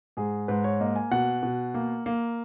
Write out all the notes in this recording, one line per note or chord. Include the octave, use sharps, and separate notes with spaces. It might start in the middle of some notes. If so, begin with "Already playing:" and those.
G#2 G#4
G#2 B4
C#5
A#3 D#5
G#5
B2 F#5
B2
A#3
A#3